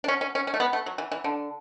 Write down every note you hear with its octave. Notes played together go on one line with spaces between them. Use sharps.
D4
C#4
C#4
C#4
C#4
A3
B3
A3
F#3
E3
E3
D3